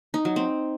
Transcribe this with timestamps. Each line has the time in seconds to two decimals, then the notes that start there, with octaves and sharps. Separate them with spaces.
0.14 D#4
0.25 F#3
0.36 C4